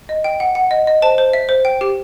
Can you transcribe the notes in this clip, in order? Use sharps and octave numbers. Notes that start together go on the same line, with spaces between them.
D#5
G5
F#5
F#5
D#5
D#5
C5 A5
C5
E5
C5
G5
G4